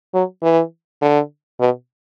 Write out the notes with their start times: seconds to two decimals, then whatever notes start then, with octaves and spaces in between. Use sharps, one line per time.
0.14 F#3
0.43 E3
1.02 D3
1.60 B2